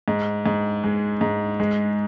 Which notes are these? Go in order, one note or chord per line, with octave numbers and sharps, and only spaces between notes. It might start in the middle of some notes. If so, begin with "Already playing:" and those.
G#2
G#2
G#3
G#2
G#3